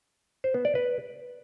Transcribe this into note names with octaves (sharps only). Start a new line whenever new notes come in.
C5
B3
D5
B4